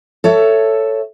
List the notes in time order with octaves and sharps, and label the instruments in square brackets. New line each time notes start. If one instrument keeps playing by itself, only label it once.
[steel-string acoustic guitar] A4 C#5 E5